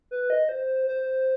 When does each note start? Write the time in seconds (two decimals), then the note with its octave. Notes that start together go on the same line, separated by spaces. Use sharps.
0.11 B4
0.30 D#5
0.49 C5
0.87 C5